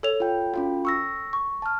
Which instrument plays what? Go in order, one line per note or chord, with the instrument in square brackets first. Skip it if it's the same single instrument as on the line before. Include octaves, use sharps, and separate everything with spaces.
[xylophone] A4 C#5 F7
[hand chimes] F4 G5
[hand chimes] C#4 F4 F#4 [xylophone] G5
[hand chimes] C#6 E6 A#6
[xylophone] C#6
[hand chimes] A5 F6